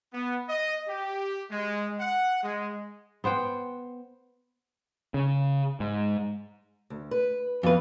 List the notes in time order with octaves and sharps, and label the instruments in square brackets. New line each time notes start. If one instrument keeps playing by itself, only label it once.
[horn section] B3
D#5
G4
G#3
F#5
G#3
[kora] B3 C5 F#5 G5
[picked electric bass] C#3
G#2
[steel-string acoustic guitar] D2
B4
[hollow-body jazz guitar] F2 B4 [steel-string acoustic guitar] E3 B3 F5